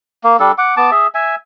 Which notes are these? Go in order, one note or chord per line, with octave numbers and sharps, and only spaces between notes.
A#3
G3 D4 A4
F#5 D6
B3 A5 D6
G#4 E5
E5 G#5